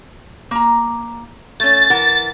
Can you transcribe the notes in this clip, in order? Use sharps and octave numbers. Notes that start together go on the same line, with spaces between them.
A#3 A#5
A3 C#4 A6
E3 A#4 F#5